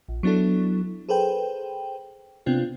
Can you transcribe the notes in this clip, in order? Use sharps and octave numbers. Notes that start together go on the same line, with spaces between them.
A#1
F#3 B3 D4 E4 A4
G#4 A4 B4 C5 G5
C3 B3 C4 D4 F4